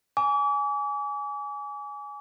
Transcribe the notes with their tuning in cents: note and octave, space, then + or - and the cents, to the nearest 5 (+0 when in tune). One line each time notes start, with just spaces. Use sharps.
G#5 +0 D6 -40